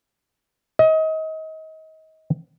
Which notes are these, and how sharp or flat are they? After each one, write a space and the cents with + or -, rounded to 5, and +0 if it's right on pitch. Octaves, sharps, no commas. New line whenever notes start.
D#5 +30